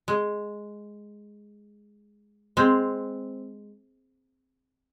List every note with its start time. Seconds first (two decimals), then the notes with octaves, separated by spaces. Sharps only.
0.08 G#3
2.57 G#3 C4